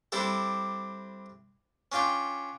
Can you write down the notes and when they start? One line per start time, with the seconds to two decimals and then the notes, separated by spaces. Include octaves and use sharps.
0.12 G3 C4 D4 E4 G4 A4
1.92 C#4 D4 F4 G5